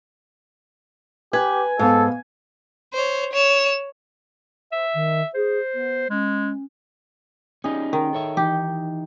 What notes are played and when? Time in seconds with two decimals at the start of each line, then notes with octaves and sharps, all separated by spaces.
1.33 G4 B4 G#5
1.79 G#2 B3 A4 F5
2.93 C5 C#5
3.32 C#5 E7
4.72 C5 E5
4.94 D#3
5.34 G#4 C5
5.73 B3
6.10 G#3 C#4
7.64 C#4 D#4 G4 G#4
7.93 D#3
8.13 A4 C#5 E5
8.37 E3 D#4 G4